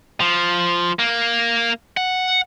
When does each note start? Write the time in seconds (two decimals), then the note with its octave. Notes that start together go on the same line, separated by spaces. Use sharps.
0.20 F3
0.99 A#3
1.97 F#5